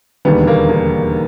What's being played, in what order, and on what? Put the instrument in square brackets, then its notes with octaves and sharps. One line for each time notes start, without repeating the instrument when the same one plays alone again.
[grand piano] E1 D#2 D3 G3 B3
A#3
A#3